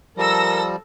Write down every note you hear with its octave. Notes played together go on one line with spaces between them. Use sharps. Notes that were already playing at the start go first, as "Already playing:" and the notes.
F3 G3 A4 A#4 E6 A#6